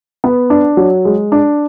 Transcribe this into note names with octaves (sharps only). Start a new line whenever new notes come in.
B3
D4
F#3
G#3
D4